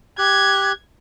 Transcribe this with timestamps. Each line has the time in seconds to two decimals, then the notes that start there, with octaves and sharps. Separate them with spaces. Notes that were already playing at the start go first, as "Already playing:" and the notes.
0.19 G4 F#6 G#6